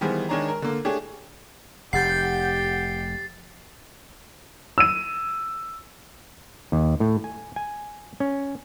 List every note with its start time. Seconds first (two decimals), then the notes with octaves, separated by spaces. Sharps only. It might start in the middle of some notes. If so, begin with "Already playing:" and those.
0.01 D#3 E3 G3 B3 G#4 C5
0.29 D#3 G#3 D4 G#4 C#5 A#5
0.48 A#4
0.62 D3 A#3
0.85 A3 D4 G4 G#4 C#5
1.93 F1 G4 F#5 G6 A6 C7
4.78 E6 D#7
6.72 D#2
7.00 A2
7.24 G#5
7.56 G#5
8.20 C#4